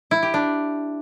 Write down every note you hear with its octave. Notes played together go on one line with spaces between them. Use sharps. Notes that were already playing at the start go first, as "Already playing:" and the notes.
E4
G4
D4